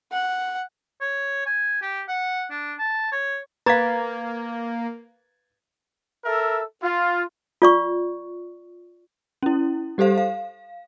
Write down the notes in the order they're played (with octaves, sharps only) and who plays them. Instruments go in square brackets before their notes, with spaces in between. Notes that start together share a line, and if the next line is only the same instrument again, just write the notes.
[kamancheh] F#5
[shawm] C#5
G#5
G4
F#5
D4
A5
C#5
[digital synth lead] A#3 [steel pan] B4 [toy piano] F5 A#5 [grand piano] G#6 A6
[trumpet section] A4 A#4 E5
F4
[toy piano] F4 D5 C#6
[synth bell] C#4 E4
G3 G4 A4 C5 F5
F5